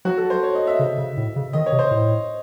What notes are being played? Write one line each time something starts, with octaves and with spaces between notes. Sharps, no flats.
F#3 F#4
A4
C5
C#5
D#5
E5
C#3
C#3
A2
C#3
D#3 D#5
C#5
C3
C5
A2